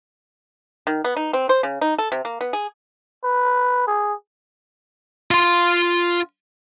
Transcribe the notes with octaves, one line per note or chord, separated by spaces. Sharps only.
D#3
B3
D#4
C4
C5
C#3
D#4
A4
C3
A#3
B3
G#4
B4
G#4
F4 C6